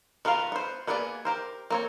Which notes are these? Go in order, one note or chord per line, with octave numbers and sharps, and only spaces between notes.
D#3 B3 F4 A#4 F5
B3 C5
A#3 B3 D4 G#4 D5
G4 A#4 C5
A#3 C4 C#5